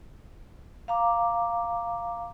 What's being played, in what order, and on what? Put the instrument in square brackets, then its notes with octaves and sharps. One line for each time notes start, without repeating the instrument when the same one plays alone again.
[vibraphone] F5 A#5 D6